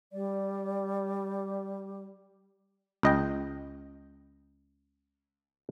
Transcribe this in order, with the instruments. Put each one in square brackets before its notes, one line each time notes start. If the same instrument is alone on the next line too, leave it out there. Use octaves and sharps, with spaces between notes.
[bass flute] G3 [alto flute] D5
[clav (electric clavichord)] C#2 D#5 G5